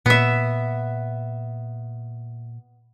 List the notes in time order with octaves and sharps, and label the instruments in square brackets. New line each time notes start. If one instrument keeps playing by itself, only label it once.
[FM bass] A#2 [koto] B3 E5